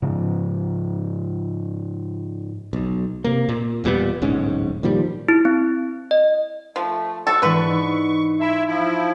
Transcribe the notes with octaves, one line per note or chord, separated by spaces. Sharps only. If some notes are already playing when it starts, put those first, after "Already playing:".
G#2 C#3 F3
B1
C3 A#3
A#2
E1 A#2 G3 B3
D1 B1 G#2 C#4
A#2 D#3 F3 G3
E4
C4
D#5
F3 A3
F#4 A4 C5 F#5 C#6
G#2 D3 E3 B4
D#4
E4 E5 A5 B5 C6
F3 E4